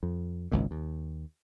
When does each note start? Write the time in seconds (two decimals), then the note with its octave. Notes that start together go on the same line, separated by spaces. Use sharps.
0.03 F2
0.52 G#1 C#2 A#2
0.71 D#2